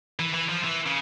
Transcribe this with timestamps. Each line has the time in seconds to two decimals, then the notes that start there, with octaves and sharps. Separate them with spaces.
0.19 E3
0.34 E3
0.49 F3
0.64 E3
0.86 C#3